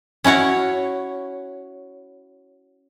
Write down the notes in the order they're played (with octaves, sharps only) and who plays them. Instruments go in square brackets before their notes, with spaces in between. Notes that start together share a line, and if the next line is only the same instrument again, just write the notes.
[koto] C#4 E4 F#4 C#5